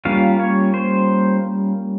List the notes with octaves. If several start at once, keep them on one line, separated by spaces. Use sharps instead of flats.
G3 A#3 C#4 F4 F5
C#5
C5